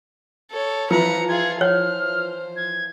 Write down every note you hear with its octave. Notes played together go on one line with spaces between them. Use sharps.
A4 C#5
E3 F3 B4 A#5 C#7
F4 G#4 G#6
C5 C#5 F6
G#6